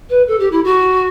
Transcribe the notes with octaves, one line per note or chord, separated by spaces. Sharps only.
B4
A4
G4
E4
F#4